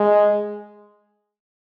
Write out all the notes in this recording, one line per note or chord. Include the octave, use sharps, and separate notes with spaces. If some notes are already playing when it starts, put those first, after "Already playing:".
Already playing: G#3